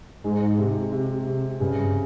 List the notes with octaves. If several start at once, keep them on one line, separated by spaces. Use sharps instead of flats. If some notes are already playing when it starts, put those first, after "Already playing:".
G#2 G#3
C3
C3
C3
G2 C#3